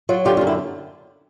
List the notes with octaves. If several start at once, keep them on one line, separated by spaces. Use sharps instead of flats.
F#3 F4
D3 F4 G4
F4
F#2
E4